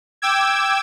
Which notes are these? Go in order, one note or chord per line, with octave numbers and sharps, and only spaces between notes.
G5 D6 E6 G#6